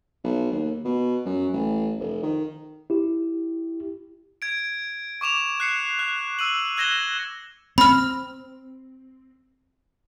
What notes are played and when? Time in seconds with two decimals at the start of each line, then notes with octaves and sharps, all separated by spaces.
0.24 B1
0.51 D#2
0.84 B2
1.25 F#2
1.53 A1
1.99 F1
2.22 D#3
2.90 E4 G4
4.42 G#6 D7
5.21 C#6 D6 E7 F7
5.60 F#6 C7 C#7
5.99 F#6
6.39 E6 D#7 F#7
6.77 E6 F#6 G#6 A#6 E7 G7
7.78 C4 B5 F6